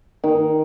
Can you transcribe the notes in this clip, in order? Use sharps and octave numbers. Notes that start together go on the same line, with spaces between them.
D#3